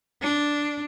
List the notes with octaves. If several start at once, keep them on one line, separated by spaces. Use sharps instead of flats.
D4